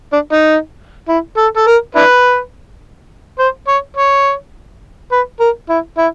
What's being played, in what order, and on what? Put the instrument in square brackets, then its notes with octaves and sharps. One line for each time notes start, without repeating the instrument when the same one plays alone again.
[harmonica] D4
D#4
E4
A4
A4
A#4
D4 E4 B4
C5
C#5
C#5
B4
A#4
E4
E4